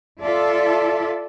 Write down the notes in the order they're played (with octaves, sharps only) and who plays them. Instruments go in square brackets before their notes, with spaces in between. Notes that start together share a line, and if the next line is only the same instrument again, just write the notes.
[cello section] F4 A4 D5 E5